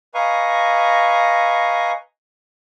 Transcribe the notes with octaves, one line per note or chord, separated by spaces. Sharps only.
B4 D#5 F5 G#5 A#5 C#6